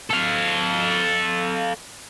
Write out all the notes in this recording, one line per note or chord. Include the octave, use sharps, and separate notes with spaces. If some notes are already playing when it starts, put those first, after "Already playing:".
A4 F5